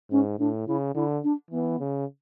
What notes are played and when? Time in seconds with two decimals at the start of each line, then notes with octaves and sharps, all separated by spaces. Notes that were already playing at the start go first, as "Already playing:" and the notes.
0.11 G#2 C#4
0.39 A2 D4
0.67 C#3 E4
0.94 D3 E4
1.23 D4
1.51 E3 B3
1.80 C#3